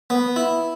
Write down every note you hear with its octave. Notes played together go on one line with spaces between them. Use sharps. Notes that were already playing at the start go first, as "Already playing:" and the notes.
B3
E4